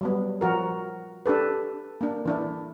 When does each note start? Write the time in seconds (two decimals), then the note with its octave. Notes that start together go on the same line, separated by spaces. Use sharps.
0.01 F#3 G3 B3
0.41 F3 F#4 A#4
1.26 D4 G4 A4 B4
2.01 A#3 D4
2.25 E3 D4 E4